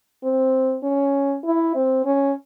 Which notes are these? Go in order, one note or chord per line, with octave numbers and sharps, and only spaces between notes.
C4
C#4
E4
C4
C#4